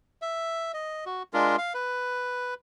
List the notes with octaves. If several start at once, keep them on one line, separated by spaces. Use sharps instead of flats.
E5
D#5
F#4
G#3 D4 F4 A#4
F5
B4